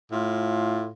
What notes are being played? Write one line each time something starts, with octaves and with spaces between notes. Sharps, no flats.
A2 F4